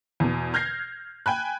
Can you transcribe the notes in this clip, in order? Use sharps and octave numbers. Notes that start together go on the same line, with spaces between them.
E2 B2
F6 G6 G#6 A#6 C7
G5 G#5 B5 F#6